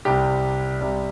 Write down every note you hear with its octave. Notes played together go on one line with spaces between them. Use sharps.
C2 C3 G3 G4
C2 C3 G3